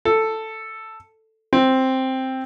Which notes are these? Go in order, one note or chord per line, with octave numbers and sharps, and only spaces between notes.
A4
C4